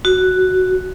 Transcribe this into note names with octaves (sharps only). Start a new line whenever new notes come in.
F#4